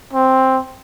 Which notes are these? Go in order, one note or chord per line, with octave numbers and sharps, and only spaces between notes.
C4